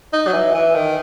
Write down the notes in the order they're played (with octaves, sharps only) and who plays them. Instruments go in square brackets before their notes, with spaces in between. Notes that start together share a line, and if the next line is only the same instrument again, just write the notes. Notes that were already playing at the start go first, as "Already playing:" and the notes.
[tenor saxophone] D#4
F#3
E3
E3
D#3